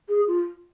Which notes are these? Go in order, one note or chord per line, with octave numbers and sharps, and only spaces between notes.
G#4
F4